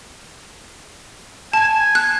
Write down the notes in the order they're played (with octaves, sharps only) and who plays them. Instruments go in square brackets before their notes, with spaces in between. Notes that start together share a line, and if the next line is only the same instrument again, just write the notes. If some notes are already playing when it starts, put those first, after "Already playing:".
[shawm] G#5 [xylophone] A5
[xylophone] F#6